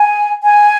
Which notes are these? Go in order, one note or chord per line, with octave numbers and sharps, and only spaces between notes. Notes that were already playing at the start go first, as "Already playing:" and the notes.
Already playing: G#5
G#5